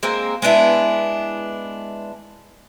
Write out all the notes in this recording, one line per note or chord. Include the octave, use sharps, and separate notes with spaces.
G#3 A#3 C4
G#3 B3 D4 E4